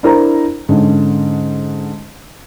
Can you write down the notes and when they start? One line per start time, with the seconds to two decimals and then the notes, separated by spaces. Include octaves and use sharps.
0.03 D4 E4 A#4 C5 A#5
0.69 G#2 D3 C#4